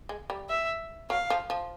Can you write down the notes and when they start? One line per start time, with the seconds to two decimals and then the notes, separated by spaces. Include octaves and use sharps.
0.09 G#3
0.30 G3
0.49 E5
1.09 F#3 F5
1.30 F3
1.50 F3